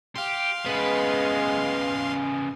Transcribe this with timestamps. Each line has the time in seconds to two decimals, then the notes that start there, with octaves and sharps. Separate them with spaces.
0.16 G4 F5 C6
0.66 C#3 G#3 B3 B4